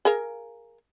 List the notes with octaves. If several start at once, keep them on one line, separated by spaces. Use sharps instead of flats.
G#4 A#4 F5